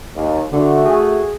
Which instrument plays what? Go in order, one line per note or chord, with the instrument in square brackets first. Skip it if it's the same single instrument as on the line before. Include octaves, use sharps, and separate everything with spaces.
[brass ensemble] D#2
[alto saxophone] D3 [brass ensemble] A3 F#4
[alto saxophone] G#4